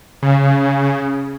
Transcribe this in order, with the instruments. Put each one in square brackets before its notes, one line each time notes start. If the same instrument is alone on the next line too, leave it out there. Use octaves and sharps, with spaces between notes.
[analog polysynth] C#3